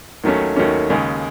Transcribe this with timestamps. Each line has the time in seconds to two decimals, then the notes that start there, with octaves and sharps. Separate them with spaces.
0.24 D#2 D#3 F#3 A3 C#4
0.56 D#2 D#3 F#3 A3 C#4
0.90 D#2 C#3 G#3